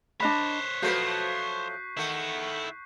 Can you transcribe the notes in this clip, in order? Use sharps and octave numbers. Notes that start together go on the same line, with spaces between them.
D4 C5 C#5 D#5 B5 F#6 B6
F3 F#3 A3 F#4 B4 G6 C7
C#6
D#3 A3 E4 F#5